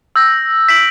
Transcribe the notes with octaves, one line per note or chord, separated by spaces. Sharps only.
E6 G6 A#6
G6 B6 D7 F#7